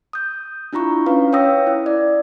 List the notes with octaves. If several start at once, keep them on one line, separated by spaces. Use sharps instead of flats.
D#6 G6
D4 E4 F4 A#5 C#6
C#4 B4 F5
C#5 F5 G5 D#6 E6 A#6
E4
D5